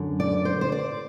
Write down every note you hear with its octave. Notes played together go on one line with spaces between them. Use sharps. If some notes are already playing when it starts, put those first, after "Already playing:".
Already playing: F#2 D3
D5
C5
C5
D5